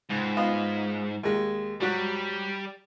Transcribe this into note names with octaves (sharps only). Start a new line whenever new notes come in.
C#2 G#2
B3 F4 D#5
D#2 G#3
G#2 F#3 G3 F#4